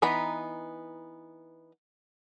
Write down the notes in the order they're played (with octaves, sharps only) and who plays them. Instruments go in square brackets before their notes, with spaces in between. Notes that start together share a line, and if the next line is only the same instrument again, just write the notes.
[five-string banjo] E3 B3 D#4 A#5 B5